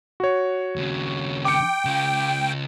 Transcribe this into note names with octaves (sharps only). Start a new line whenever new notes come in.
F#4 C#5
D#2 C#3
G5 D6 C#7
C#3 F4